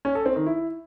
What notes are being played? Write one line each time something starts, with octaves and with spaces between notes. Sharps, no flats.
C#4
A4
C4
D#3
E4